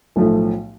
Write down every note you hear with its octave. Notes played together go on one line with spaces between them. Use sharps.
B1 A2 F3 A3